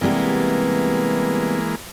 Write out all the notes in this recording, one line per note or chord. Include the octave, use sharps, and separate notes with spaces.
C3 E3 G3 G#3 A#3 B3